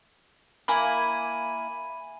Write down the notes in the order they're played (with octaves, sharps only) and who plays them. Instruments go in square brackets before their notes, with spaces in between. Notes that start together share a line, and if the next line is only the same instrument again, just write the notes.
[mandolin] A#3 E4 [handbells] G#5 B5